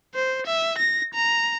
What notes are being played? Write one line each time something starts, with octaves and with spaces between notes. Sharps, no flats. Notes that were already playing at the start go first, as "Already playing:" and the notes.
C5
E5
A#6
A#5